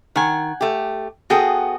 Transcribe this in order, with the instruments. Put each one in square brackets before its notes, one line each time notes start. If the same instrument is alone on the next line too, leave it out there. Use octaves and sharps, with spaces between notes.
[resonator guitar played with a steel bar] D#3 [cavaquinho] F#5 G#5
[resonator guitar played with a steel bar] A3 G4
[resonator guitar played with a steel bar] B3 G#4 A4 [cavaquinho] F#4 G5 D#6